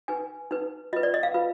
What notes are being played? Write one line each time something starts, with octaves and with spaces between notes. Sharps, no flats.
D#4 B4 G#5
D#4 B4
F4 B4 D#5
D5
D#5
F5
F4 B4